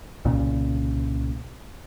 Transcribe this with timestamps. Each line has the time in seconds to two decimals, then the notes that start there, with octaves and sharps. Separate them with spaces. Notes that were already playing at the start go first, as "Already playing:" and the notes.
0.25 C2 A#2 C#3